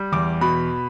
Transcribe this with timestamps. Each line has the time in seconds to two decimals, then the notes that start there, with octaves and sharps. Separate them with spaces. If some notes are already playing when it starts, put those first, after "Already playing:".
Already playing: G3
0.12 E2 D6
0.41 B2 B5